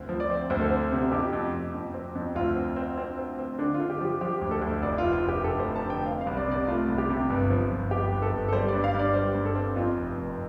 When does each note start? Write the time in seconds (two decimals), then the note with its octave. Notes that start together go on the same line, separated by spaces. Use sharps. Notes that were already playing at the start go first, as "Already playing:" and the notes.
Already playing: D2 C4
0.09 F3
0.20 D5
0.30 C4
0.50 D2 C5
0.61 A4
0.70 C4 C5
0.92 C3
1.12 F2 G4
1.33 F2
1.53 F2
1.74 F2
1.94 C4
2.15 F2
2.35 D2 F4
2.56 C4
2.76 C4
2.98 C4
3.18 C4
3.39 C4
3.59 D3 D4
3.74 F4
3.80 D3
3.90 G4
4.01 F3 G4
4.21 F3 G4
4.41 D2
4.51 A4
4.61 D2
4.82 F1 D5
4.98 F4
5.03 F1
5.13 F4
5.24 F1 G4
5.44 F1 A4
5.59 C5
5.65 F1
5.76 A5
5.85 D3
5.90 G5
6.06 C4 F5
6.21 F5
6.27 C2
6.37 D5
6.47 C3 D5
6.68 A3 F4
6.88 C2
6.98 G4
7.09 C3
7.30 G1
7.50 F3
7.70 G1
7.91 G1 G4
8.12 G1
8.22 A4
8.32 G1
8.48 A4
8.53 G3 C5
8.68 D5
8.74 G2
8.84 F5
8.94 G2
8.99 D5
9.14 G3 C5
9.35 G2
9.45 A4
9.55 C4
9.76 F2 F4
9.97 F1
10.17 F1